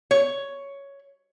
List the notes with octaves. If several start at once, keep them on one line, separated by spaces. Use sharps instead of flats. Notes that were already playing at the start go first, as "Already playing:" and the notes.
C#5